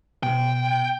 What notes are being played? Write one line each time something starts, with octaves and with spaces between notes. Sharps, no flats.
B2 G5